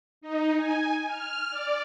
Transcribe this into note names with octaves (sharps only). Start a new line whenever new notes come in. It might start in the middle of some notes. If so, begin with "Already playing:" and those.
D#4
G#5
F6
D5